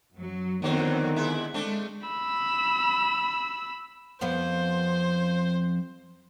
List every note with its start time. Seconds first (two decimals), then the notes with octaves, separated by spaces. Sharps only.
0.12 F#2 F#3
0.62 F2 D3 D#3 F#3 B3 C4 C5
1.16 C3 G#3 E4
1.54 G#3 A3 C4 D4
2.07 B5 E6
4.21 F2 F3 B3 C5